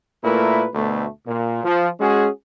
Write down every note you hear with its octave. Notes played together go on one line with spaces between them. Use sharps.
A#2 A3 E4 A#4 B4
D2 B2 A3
A#2
F3
G#3 C#4 F#4 G#4